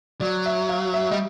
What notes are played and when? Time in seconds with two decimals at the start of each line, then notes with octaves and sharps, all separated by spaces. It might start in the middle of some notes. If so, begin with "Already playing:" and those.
0.21 F#3 D5
0.46 E5
0.69 F5
0.94 E5
1.11 G3 D#5